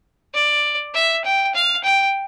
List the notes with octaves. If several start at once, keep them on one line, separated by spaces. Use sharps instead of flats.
D5
E5
G5
F5
G5